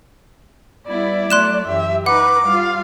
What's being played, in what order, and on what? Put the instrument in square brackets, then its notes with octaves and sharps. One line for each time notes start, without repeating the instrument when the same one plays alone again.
[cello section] G3 B3 E4 [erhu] D5
[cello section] F#3 A3 [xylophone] C6 F#6 E7
[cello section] F#2 E3 G4 [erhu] E5
[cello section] D#4 [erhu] B4 [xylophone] F#5 [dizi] D6
[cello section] G3 F4 [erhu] F5